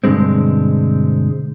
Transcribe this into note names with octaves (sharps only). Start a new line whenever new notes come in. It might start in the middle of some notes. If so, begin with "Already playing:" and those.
G2 B2 D3 G#3 C4